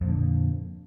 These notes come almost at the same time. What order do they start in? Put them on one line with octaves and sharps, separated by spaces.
F2 A#2 D3